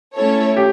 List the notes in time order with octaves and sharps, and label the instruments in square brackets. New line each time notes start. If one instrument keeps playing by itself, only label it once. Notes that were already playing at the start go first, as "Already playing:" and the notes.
[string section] A3 C#4 E4 A4 C#5
[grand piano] G4